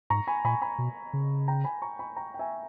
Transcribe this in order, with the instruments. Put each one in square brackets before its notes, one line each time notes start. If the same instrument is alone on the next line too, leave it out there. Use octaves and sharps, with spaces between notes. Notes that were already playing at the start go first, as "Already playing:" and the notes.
[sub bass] G#2 [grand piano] A#5 C#6
[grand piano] G#5 B5
[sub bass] A#2 [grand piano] G#5 B5
[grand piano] G#5 B5
[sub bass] B2
C#3
[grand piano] G5 A#5
G#5 B5
A#5 C#6
G#5 B5
G5 A#5
G5
E5 G#5